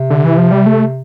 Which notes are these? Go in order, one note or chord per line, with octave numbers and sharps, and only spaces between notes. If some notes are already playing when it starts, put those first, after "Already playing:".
Already playing: C3
D3
E3
F3
G3
A3